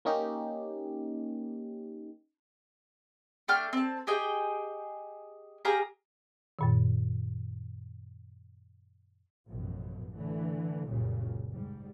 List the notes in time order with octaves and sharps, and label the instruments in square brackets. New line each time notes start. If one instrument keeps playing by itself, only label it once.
[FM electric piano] A#3 C#4 D#4 G4
[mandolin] A3 D4 G5 F6
C4 A5
G4 G#4 D#5 G5
G4 G#4 F5 A#5
[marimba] F#2 A#2 D#3
[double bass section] A1 F#2 B2 F3
D3 E3 A3
F#1 C#2 F#2 A#2 C#3 G3
G#2 G3